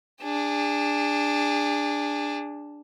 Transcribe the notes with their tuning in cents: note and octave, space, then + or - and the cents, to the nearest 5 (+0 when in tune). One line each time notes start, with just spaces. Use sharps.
D4 +0 G#4 -30